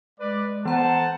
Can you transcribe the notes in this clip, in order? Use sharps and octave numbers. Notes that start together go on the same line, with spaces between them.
G#3 B4 D5
E3 B3 C5 F#5 A5 A#5